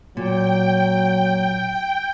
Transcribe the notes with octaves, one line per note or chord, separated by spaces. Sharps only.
A#2 F#3 G5